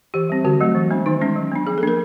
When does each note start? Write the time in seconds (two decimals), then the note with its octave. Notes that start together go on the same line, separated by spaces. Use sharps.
0.14 E3 G4
0.30 G3 C4
0.44 D3 F#4
0.61 F#3 A3 C4
0.75 E3
0.90 G#3 B3 D4
1.06 D#3 D#4
1.21 G#3 C#4
1.36 F#3
1.52 B3 D4
1.67 F3 G#4
1.78 A4
1.83 A#3 D4 A#4